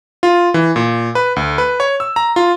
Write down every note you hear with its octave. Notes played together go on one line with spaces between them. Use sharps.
F4
E3
A#2
B4
D2
B4
C#5
E6
A#5
F4